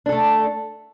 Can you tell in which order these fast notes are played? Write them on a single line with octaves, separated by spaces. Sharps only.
D4 A4 A3